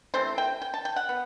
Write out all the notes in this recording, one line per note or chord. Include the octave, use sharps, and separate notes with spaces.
C3 E3 A3 C4 C5
G5
G5
A5
G5
F#5
B3